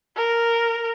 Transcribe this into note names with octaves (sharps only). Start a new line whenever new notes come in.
A#4